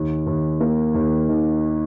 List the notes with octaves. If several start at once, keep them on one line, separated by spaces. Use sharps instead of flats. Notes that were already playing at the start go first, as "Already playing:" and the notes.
Already playing: D#2
D#2
A#3
D#2
D#3